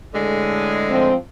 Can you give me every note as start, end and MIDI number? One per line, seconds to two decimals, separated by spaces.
0.14 1.10 45
0.14 1.10 50
0.14 1.10 56
0.89 1.15 53
0.89 1.15 60